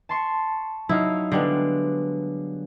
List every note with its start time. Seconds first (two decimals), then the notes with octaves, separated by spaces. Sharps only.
0.09 A5 C6 C#6
0.89 F#3 D#4 E4 F5
1.32 D3 G3 G#3 B3 D7